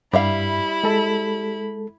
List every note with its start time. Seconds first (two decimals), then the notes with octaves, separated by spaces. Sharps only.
0.13 G2 G3 E4 E5 F5 B5
0.84 G#3 A4